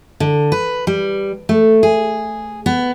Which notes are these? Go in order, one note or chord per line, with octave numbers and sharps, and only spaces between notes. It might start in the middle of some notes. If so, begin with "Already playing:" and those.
D3
B4
G3
A3
G#4
B3